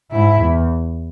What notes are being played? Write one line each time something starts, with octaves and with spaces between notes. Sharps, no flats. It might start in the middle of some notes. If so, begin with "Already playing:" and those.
G#2 E4
E2